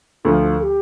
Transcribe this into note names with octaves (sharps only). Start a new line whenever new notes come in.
D2 D3 F3 F4
A4
G4